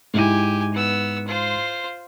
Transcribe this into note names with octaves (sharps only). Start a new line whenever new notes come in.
G#2 E4 G4 G#5 D#7
B3 E6
F4 C5